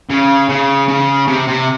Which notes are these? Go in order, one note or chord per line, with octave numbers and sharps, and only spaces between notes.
C#3
C#3
C#3
C3
C3